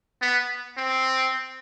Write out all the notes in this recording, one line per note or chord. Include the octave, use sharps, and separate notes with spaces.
B3
C4